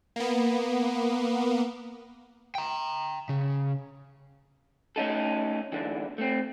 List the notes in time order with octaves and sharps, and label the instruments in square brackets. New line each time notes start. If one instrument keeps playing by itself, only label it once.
[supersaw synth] A#3 B3
[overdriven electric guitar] G5 A#5
C#3
[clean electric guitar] A3 C#4 D#4 A4
E2 D3 E3
A3 C4